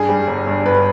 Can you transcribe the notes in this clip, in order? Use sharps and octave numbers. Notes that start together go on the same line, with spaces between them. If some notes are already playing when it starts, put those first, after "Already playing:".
Already playing: G2 G#4
G3
G1
G2
G1 B4